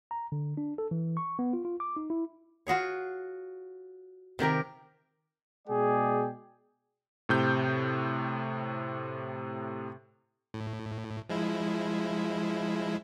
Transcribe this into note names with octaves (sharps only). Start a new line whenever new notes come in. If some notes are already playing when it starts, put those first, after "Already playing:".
A#5
D3
D4
A4
E3
C#6
B3
F4
F4
D6
D#4
E4
F4 F#4 G#4 C#5
C3 D#3 G4 A#4
B2 G#3 G#4 D5 G5
A2 C3 G6
A2
F3 G#3 E4